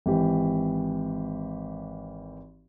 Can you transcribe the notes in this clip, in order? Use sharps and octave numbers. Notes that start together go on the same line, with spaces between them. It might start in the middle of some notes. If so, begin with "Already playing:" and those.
G#1 E3 G4